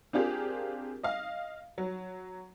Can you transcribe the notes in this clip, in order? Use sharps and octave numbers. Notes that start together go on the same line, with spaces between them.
C4 D4 F4 G4 G#4 A#4
D#5 F5
F#3